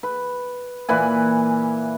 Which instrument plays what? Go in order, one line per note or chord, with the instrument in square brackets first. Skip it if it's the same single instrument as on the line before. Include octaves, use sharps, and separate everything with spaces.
[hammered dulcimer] B4
A#2 E3 B4 G#5